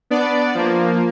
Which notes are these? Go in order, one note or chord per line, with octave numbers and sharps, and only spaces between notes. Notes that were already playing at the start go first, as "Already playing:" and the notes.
B3 D4 D5
F3 A#3